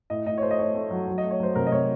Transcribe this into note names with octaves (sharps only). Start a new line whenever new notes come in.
A2 D#5
A2 D#5
C#5
A3 C5
D#5
A3 C#5
A3
F#3
F#3
D#5
A3
C#5
F#3 C5
C3 A#4
D#5
C3 C#5